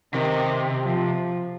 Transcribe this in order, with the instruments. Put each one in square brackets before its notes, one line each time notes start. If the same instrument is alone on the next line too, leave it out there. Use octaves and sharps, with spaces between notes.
[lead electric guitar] C3 [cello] D#3
[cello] F3